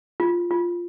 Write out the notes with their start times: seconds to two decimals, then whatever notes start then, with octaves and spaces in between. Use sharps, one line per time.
0.20 F4
0.51 F4